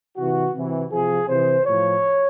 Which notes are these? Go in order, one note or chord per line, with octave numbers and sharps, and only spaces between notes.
C3 E3 F#4
C3 E3
C3 F3 G#4
C3 E3 C5
A2 F3 C#5